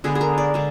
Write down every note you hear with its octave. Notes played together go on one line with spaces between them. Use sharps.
D3 G#3 B3 G#4
G#4
A#4
D5
D3 G#3